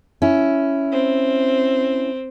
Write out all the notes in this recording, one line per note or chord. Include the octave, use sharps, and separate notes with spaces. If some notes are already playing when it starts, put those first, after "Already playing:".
C#4 E4
C4